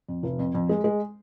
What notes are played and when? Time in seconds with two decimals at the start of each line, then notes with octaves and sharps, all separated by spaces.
0.09 F2
0.23 F1
0.39 F2
0.55 F2
0.69 G#3
0.84 G#3